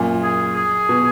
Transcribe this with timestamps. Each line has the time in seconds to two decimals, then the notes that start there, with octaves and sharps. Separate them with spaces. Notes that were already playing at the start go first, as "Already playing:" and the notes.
Already playing: F#2 A#2
0.23 G#4
0.56 G#4
0.89 B2